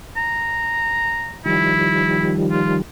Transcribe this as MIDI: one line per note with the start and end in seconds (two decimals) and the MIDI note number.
0.17 1.37 82
1.46 2.82 51
1.46 2.82 53
1.46 2.82 55
1.46 2.33 64
2.51 2.75 65